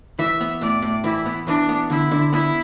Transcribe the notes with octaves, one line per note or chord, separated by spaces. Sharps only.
E3 E5
B3
A2 D5
A2
E3 E4
B3
E3 D4
B3
D3 E4
D3
B3 E4